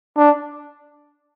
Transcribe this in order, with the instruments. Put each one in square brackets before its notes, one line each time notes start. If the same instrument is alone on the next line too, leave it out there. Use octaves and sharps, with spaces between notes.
[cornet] D4